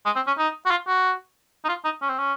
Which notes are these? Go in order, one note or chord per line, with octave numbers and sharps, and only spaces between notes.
G#3
C4
C#4
D#4
F#4
F4
F#4
D#4
F4
D#4
C#4
C4
C#4